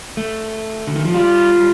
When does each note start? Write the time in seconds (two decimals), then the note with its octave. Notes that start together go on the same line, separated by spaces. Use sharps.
0.17 A3
0.87 D3
0.96 D#3
1.05 F3
1.14 G3 F4